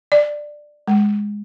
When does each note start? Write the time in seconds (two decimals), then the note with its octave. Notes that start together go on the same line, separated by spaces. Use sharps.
0.12 D5
0.88 G#3